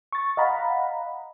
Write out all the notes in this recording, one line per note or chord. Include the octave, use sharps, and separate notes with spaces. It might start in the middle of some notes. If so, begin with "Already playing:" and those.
C#6 A6
D#5 F5 F#5 A#5 B5